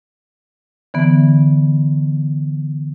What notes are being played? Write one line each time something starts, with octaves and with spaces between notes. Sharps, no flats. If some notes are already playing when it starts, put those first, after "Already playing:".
D3 E3 B3